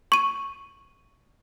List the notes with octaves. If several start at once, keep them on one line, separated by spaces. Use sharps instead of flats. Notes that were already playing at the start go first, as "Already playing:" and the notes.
C#6 D#7